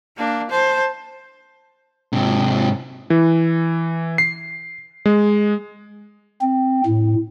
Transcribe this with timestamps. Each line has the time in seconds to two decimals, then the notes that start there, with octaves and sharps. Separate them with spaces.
0.17 A#3 D4
0.50 C5 A5
2.13 G#2 C3
3.10 E3
4.18 C7
5.06 G#3
6.42 C4
6.86 A2